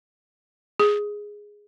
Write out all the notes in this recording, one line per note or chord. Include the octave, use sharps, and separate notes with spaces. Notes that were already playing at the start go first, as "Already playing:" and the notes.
G#4